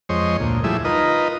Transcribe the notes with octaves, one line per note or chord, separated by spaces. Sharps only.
F2 G#3 C5 C#5 D#5
D2 A#2
F3 G3 A3 E4 G#4 E5
D#4 F4 A#4 B4 D#5